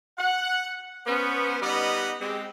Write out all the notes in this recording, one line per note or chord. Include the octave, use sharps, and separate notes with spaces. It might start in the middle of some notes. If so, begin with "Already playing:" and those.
F#5
B3 C#4 C5
G3 B3 D#4 B4 D#5 F#5
G#3 C4 G4